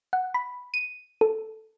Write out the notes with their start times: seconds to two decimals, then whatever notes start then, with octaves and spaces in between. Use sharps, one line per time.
0.13 F#5
0.34 B5
0.74 D#7
1.21 A4